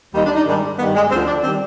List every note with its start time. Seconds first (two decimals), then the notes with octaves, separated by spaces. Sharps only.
0.14 D#2 D#3 G3 D#4
0.25 D4
0.35 D#4
0.46 G#2 D#3 G3 D4
0.79 G2 D#3 G3 B3
0.95 G#3
1.11 D2 D3 F3 C4
1.27 D4
1.44 D#3 G3 C4